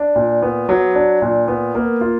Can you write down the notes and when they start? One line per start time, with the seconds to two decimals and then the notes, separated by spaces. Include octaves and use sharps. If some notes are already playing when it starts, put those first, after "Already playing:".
Already playing: D4
0.16 A#2
0.42 B3
0.69 F#3
0.95 D4
1.22 A#2
1.48 B3
1.75 A#3
2.01 F4